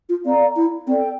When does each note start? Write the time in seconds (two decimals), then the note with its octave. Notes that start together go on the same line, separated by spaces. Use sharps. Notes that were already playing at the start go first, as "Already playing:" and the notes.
0.09 F4
0.25 C4 A4 D5 F5 A#5
0.56 E4
0.87 C4 A4 D5 G5